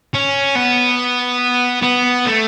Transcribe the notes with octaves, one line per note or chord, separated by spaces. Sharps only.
C#4
B3
B3
A3